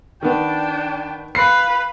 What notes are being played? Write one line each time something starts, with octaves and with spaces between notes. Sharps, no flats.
D#3 B3 D4 G5
B4 F5 C7